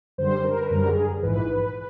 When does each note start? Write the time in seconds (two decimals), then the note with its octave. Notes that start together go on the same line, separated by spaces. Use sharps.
0.18 F#2 D3 G3 C5
0.44 A#4
0.61 B4
0.70 F#2 D3 G3 A#4
0.88 G#4
1.22 A#1 G#2 E3 B4